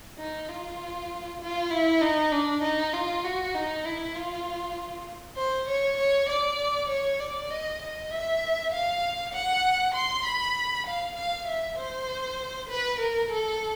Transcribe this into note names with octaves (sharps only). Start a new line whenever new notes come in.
D#4
F4
F4
E4
D#4
D4
D#4
F4
F#4
D#4
E4
F4
C5
C#5
C#5
D5
C#5
D5
D#5
D#5
E5
F5
F#5
C6
B5
F5
F5
E5
C5
B4
A#4
A4